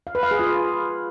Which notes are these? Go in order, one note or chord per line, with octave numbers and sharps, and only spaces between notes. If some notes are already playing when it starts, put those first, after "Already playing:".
F5
B4
F5
G#4
F4